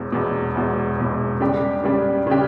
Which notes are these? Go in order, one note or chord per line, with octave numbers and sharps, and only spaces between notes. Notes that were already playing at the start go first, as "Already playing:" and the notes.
Already playing: E1 E2 B2
E1 E2 B2
E1 E2 B2
E1 E2 B2
C#3 G3 D4 G4
C#3 G3 D4 G4
C#3 G3 D4 G4